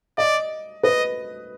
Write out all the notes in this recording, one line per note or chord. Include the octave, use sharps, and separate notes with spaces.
D5 D#5
B4 D#5